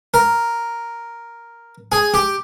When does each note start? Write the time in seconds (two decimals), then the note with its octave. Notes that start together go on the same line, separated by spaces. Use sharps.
0.14 A#4
1.92 G#4
2.14 G4